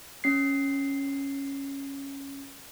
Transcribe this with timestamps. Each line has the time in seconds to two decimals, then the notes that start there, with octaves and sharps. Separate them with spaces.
0.24 C#4 C7